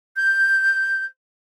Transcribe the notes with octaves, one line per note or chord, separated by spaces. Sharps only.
G6